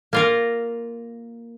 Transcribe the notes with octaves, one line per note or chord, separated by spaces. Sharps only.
A#3 F4 A#4